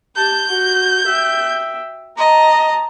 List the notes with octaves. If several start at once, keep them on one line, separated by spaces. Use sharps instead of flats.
G4 A5 G6
F#4
E5 G5
D#5 A5 A#5